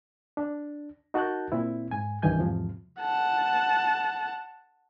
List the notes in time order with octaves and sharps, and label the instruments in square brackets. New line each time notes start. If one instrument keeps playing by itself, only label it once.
[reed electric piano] D4
D#4 F#4 A#4 A5 F#6 G6
A#2 C4 E4
G#2 G#5
C2 G2 D#3 E3 G#5 G6
E2 G#2 C3 F3
[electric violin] F#5 A5